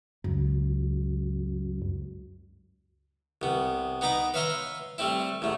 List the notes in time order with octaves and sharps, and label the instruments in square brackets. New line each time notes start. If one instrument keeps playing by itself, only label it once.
[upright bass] C#2 [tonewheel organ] F#2
[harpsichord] C2 B3
B3 D#4 A#5 B5 D6
B4 C#5 E5 F5 A#5 C6
G3 A3 C4 E4
A1 E2 A3